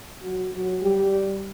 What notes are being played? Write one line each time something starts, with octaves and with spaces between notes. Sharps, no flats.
F#3 F#4
F#3 F#4
G3 G4